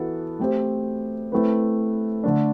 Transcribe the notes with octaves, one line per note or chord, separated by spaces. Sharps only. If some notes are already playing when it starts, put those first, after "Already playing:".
Already playing: E3 B3 F#4 A4
A3 C4 G4 C5
A3 C4 E4 B4
D3 A3 D4